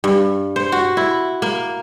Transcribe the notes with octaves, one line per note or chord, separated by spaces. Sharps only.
G2
C5
F#4
E4
A#3